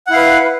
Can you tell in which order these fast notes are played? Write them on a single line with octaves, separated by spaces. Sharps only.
F#5 E4 F5 B4